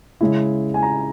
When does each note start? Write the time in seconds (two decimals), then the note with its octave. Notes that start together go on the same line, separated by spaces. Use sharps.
0.21 C#3 G#3 C#4 E4
0.74 G#5
0.83 A#5